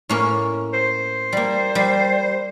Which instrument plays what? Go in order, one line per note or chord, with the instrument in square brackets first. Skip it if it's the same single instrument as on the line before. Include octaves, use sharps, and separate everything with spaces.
[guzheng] A2 A#3 C#4
[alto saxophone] C5
[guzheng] G3 A#3
G3